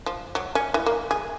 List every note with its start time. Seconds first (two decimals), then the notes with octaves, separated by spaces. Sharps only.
0.06 F3
0.35 F#3
0.55 C#4
0.74 E3
0.86 A#3
1.11 G#4